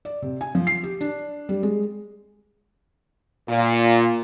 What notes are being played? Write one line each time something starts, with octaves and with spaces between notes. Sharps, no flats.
D5
C3
G#5
F3
C7
G4
D4
G3
G#3
A#2